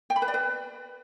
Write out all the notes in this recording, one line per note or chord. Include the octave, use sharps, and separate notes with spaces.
G5
B5
B4
D5
B4